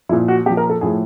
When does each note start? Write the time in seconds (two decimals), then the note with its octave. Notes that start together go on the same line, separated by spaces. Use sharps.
0.09 A#2 F3 E4
0.28 F#4
0.46 A#2 G4
0.50 F3
0.57 A#4
0.70 A4
0.81 A2 F3 G#4